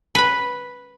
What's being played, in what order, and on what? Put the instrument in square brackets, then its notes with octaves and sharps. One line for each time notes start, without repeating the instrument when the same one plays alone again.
[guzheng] B4 B5